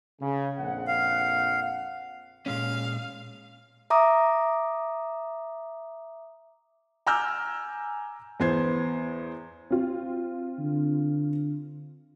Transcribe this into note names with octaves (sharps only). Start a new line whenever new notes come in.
C#3
A#1 F2 F#5
F5
A#2 G#3 C#4 F5
E5 A#5 D6 D#6
G#5 A#5 D6 E6 F6 G6
E2 B3 C5 G#6 C7
C4 F4
D3